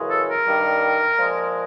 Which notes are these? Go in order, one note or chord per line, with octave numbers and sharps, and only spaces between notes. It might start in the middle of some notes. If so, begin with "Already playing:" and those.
Already playing: F#2 C#3 E3 G#3
A4
A#4
G2 D#3 G3
A#2 F3 G#3